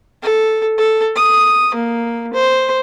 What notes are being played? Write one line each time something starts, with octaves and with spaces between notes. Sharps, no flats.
A4
A4
D#6
A#3
C5